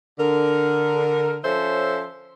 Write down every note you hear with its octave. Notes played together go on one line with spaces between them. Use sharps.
D3 A#4
F3 C#4 A4 C5 C#5 E5